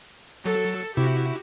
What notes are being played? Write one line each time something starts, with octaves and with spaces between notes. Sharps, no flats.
F#3 A4
C3 E4 F#4 G4